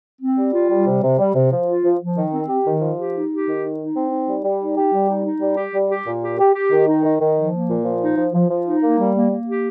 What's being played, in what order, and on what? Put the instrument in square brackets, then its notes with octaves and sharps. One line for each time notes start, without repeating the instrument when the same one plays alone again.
[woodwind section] C4
G3
F4
G3
C3
C3
G3
C3
F3
F4
F3
F3
D#3
C4
G4
D#3
F3
G4
D#4
G4
D#3
D#4
D#4
C4
D#4
G3
G3
D#4
G4
G3
D#4
D#4
G3
G4
G3
G4
A#2
G4
G4
G4
D#3
D#4
D#3
D#3
F3
A#3
A#2
F3
D#4
F3
F3
F3
D#4
A#3
G3
A#3
A#3
G4